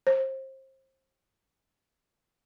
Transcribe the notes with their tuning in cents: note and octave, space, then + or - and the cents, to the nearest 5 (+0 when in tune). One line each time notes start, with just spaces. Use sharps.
C5 +30